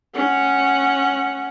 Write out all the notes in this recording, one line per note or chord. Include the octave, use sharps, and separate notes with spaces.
C#4 F#5